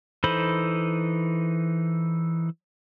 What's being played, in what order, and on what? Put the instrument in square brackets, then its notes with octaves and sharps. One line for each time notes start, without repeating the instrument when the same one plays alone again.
[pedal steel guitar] E3 D#4 A4 C5 B5